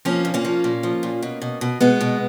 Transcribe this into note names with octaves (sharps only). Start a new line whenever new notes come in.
F3 A#3 C#4
A#2
A#3 C#4
F3
A#2
F3
A#2
B2
B2
B2
B2 G#3 B3
B2